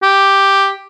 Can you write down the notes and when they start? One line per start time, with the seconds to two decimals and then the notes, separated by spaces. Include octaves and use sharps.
0.03 G4